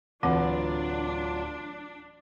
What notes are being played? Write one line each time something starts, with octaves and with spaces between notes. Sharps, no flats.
D1 E3 F#3 C4 D4 F4 B4 F#5